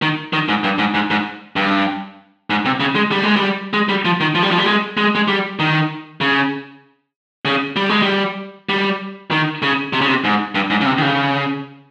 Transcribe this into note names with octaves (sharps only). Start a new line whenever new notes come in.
D#3
D#3
G#2
G2
G#2
G#2
G#2
G2
G#2
C3
C#3
G#3
G3
G#3
G3
G#3
G3
F3
D#3
F3
G3
F3
G3
G#3
G#3
G#3
G3
D#3
C#3
C#3
G3
G#3
G3
G3
D#3
C#3
C3
C#3
C3
G#2
G2
G#2
C#3
C3
D#3
C#3